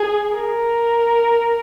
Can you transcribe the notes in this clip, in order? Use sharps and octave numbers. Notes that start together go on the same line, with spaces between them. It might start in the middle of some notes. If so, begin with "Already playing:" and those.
Already playing: G#4
A#4